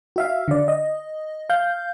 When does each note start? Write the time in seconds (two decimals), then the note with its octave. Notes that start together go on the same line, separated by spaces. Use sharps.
0.16 F#4 E5 F5
0.48 D3 D5
0.68 D#5
1.50 F5 G6